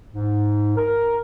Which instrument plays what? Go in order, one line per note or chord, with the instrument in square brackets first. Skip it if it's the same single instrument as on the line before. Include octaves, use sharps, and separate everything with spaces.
[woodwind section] G#2
A#4